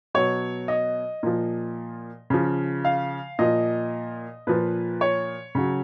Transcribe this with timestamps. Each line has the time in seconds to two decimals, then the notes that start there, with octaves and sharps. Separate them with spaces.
0.14 B2 F#3 C#5
0.68 D#5
1.23 A#2 F3
2.30 C#3 F3
2.85 F5
3.39 A#2 F3 D#5
4.47 A#2 F3 B4
5.01 C#5
5.55 C#3 F#3